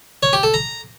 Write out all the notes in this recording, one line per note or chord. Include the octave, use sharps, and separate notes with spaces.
C#5
G4
A4
A#5